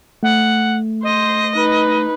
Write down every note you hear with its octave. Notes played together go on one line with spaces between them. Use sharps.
A3 F#5
C5 D#5
D#4 B4